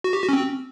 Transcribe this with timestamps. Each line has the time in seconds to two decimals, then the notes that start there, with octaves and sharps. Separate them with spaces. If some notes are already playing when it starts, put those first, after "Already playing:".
0.04 F#4
0.13 G4
0.23 F#4
0.29 C#4
0.33 C4